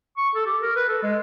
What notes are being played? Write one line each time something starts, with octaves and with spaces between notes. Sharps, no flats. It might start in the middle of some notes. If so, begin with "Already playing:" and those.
C#6
A4
G4
A#4
B4
A4
G#3